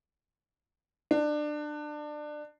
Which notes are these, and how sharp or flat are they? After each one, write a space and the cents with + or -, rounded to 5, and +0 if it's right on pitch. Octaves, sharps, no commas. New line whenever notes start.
D4 +25